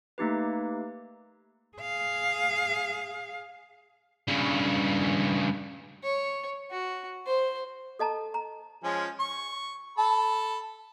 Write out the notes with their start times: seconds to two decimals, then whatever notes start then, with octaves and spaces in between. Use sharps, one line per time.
0.18 A3 A#3 D#4 G4 B4
1.78 G#4 F5
4.28 G2 C#3
6.03 C#5
6.71 F#4
7.26 C5
7.99 A4 D#5 A5 A#5
8.34 A#5
8.84 F3 G#3 C#4
9.20 C#6
9.98 A4 A5 B5